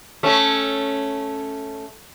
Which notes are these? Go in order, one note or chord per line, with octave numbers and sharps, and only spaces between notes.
A3 C#4